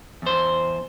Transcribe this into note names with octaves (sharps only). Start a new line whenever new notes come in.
E2 C5